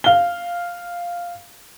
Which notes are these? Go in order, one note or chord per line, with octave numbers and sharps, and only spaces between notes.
F5 G7